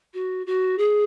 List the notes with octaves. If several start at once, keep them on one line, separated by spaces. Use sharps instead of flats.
F#4
F#4
G#4